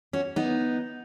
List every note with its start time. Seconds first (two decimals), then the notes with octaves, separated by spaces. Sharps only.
0.13 C#4 F#4
0.36 B3 D#4